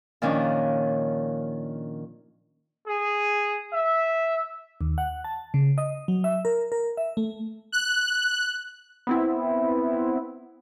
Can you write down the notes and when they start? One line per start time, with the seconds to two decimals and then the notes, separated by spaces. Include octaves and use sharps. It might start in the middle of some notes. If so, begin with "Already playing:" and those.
0.22 A#2 D#3 F3 C#4 D4
2.87 G#4
3.73 E5
4.81 D#2
4.98 F#5
5.24 A5
5.54 C#3
5.78 D#5
6.08 F#3
6.24 E5
6.45 A#4
6.72 A#4
6.97 E5
7.17 A3
7.72 F#6
9.07 B3 C4 E4